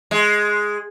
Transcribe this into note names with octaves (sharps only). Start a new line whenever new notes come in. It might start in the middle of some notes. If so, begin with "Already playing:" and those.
G#3